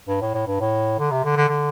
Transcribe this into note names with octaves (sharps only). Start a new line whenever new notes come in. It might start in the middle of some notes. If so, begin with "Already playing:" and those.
G2
A2
A2
G2
A2
D3
C3
D3
D3
D3